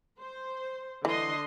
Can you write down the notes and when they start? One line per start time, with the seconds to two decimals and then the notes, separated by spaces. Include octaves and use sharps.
0.20 C5
1.05 D3 E3 D#5 C6